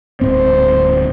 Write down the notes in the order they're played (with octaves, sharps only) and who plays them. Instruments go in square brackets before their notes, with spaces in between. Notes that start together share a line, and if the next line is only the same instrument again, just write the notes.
[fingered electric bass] D1 G#2 C4 [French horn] C5